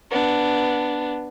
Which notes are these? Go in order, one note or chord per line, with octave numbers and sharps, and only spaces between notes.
B3 D4